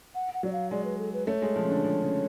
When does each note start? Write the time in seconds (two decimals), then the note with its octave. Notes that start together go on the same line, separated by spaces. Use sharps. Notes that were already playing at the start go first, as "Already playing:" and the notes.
0.15 F#5
0.34 F#5
0.43 F#3 D5
0.53 F5
0.71 G#3 D5
0.85 B4
0.99 A4
1.13 B4
1.27 A3 C#5
1.42 G#3
1.56 F3
1.63 C#3
1.70 D3
1.84 F3
2.02 C#3